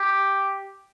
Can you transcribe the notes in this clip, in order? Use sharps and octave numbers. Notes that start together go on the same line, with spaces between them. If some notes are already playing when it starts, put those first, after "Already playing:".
Already playing: G4